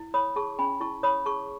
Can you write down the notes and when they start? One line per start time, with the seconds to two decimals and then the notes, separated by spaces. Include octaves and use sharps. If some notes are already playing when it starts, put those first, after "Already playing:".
Already playing: E4
0.14 C#5 B5 D#6
0.36 G#4 A5 C#6
0.59 C#4 G#5 B5
0.80 E4 A5 C#6
1.03 C#5 B5 D#6
1.26 G#4 A5 C#6